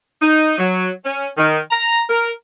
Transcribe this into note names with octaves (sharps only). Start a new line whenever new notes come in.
D#4
F#3
C#4
D#3
A#5
A#4